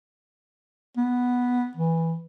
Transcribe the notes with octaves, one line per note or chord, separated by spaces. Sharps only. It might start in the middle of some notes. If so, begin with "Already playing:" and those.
B3
E3